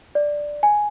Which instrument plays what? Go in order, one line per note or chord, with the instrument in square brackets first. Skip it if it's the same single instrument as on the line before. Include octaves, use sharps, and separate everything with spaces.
[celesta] D5
G#5